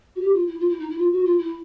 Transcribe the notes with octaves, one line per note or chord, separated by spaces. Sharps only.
F#4
G4
F4
E4
F4
E4
D#4
E4
F4
F#4
F4
E4